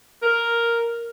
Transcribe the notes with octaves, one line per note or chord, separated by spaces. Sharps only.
A#4